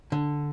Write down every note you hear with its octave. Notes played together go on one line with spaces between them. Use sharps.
D3